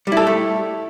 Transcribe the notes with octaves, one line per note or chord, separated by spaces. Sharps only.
G3 A3 E4 G4 A4